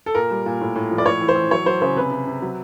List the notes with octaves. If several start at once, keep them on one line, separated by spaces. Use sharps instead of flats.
A4
A#2 A#4
G3
A#2
A2
A2
F3
D5
A2 C#5
E3
C5
E3
F#3 C#5
F#3 C5
C#3 C5
C3 B4
C3
C3
F#3